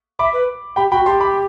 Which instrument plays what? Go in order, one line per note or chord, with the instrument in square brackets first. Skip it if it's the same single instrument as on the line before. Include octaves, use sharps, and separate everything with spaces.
[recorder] E5 [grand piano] B5 D6
[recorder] B4
[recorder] G4 [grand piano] G5 B5
[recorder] F#4 [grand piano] G5 B5
[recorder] G4 [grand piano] A5 C6
[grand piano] B5 D6